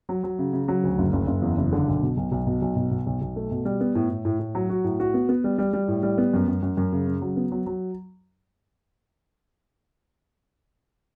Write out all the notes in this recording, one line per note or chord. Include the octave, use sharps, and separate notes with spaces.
F#3
F#3
C#3
C#3
F#3
D2
F#1
F#1
F#1
E2
F#1
D3
B1
B2
B1
B1
B2
B1
B2
B2
B1
B1
A3
B2
G3
B3
A2
A2
A2
A2
F#3
F#4
A2
F#4
B3
B3
G3
G3
G3
A2
G3
B3
F#2
F#2
F#2
F#2
C#3
C#3
F#3
B3
F#3
F#3